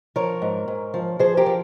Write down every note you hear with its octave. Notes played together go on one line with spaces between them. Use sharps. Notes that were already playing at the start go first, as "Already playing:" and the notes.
F3 A#4 C#5
G#2
G#2
F3
F3 G#4 C5
G4 A#4
F3